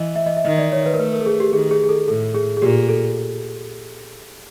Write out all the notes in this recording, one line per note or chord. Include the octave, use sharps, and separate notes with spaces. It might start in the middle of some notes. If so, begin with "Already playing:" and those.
Already playing: E3 D#5
E5
D#5
E5
D#3 D#5
D5
C#5
B4
A#4
A3 B4
A#4
A4
G#4
G4
D#3 G#4
G#4
G#4
A4
A2 A4
G#4
G#4
A#2 G4
A4